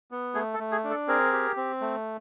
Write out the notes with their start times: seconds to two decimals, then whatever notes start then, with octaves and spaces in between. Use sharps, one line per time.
0.11 B3
0.34 A3 G#4
0.54 A4
0.59 A3
0.72 G#4
0.84 D4
0.90 A4
1.08 C4 G#4 A#4
1.33 G4
1.57 C4
1.81 A3